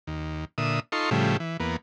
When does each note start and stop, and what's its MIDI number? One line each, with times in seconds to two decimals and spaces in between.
0.07 0.45 39
0.58 0.80 46
0.58 0.80 50
0.58 0.80 76
0.58 0.80 87
0.92 1.10 63
0.92 1.10 65
0.92 1.10 69
0.92 1.10 84
0.92 1.10 85
1.11 1.37 45
1.11 1.37 49
1.11 1.37 53
1.11 1.37 55
1.11 1.37 57
1.40 1.57 52
1.60 1.76 40
1.60 1.76 58
1.60 1.76 59